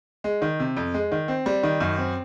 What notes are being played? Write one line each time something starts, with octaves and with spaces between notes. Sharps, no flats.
G#3
D#3
C3
F2
G#3
D#3
C4
G3
D#3
F#2
C4